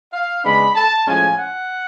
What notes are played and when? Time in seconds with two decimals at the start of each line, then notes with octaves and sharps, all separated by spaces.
0.13 F5
0.44 C#3 G#3 B3 D4 B5
0.75 A5
1.06 A2 F3 G#3 C#4 G#5
1.37 F#5